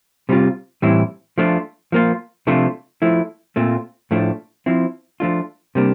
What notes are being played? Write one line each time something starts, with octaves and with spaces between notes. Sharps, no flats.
C3 G3 C4 F4
A2 E3 G3 C4 E4
F3 A3 D4 F4
F3 A#3 F4
C3 F3 A3 D4 F4
F3 A3 E4
A#2 A3 C4 F4
A2 F3 A3 D4
F3 C4 E4
F3 A3 D4 F4
C3 G3 A#3 D4